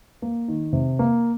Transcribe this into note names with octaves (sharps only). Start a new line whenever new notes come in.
A#3
D#3
C3
A#3